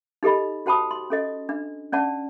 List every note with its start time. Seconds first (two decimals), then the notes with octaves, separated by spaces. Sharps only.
0.23 D#4 G4 A4 D#5 B5
0.66 F#4 C5 G5 A5 B5 D#6
0.91 C6
1.10 C#4 A4 D#5
1.49 D4
1.92 C#4 D5 F#5 A5